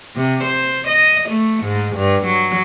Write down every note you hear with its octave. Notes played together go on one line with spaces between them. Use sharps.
C3
C5
D#5
A3
G#2
G2
F#3